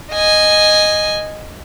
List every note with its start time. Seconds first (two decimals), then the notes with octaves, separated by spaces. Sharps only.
0.12 D#5 G#5